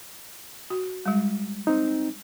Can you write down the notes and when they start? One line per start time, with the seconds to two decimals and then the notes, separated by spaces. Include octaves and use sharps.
0.70 F#4
1.06 G3 G#3
1.67 C4 D#4